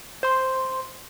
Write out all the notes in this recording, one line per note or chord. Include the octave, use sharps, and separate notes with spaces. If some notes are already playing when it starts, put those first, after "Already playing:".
C5 C6